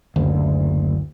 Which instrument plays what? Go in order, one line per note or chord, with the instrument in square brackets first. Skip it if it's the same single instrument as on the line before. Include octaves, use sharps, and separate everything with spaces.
[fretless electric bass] F#1 D2